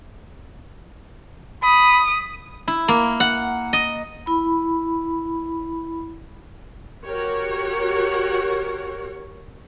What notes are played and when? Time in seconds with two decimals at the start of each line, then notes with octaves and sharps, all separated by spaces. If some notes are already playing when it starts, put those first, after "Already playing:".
1.64 B5 D#6
2.68 E4
2.88 A#3
3.20 F#5
3.73 D#5
4.26 E4 B5
7.07 F#4 G4 A#4 C#5